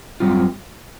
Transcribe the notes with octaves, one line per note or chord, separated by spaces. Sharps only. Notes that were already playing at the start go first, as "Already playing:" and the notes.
F#2 D3 G3 C4 F4